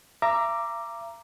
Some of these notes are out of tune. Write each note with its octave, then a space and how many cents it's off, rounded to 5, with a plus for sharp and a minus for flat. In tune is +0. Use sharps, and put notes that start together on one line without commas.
E5 +40 A#5 +0 D6 +0